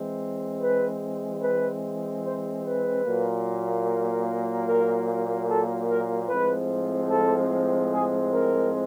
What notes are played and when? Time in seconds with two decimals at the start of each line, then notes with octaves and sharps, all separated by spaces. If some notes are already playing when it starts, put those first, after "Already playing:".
Already playing: E3 G#3 C4
0.61 B4
1.42 B4
2.23 C5
2.64 B4
3.04 A#2 F#3 A#3
4.66 A#4
5.48 A4
5.88 A#4
6.29 A2 F3 G#3 C4 B4
7.10 A4
7.91 G#4
8.33 A#4